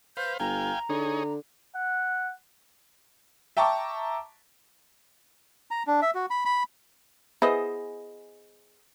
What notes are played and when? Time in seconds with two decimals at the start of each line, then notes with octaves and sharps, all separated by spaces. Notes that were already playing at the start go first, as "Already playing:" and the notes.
0.17 B4 C5 F5 G6
0.40 G1 F5 G5 G#5 A#5
0.90 D3 D#4 G#4 C#5
1.76 F#5
3.57 E5 G5 A5 A#5 C#6 D6
5.71 A#5
5.87 D4
6.02 E5
6.15 F#4
6.30 B5
6.45 B5
7.42 B3 E4 G#4 C5 D#5